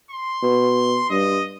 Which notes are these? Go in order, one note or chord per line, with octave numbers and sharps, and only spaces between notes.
C6
B2
G2 D#5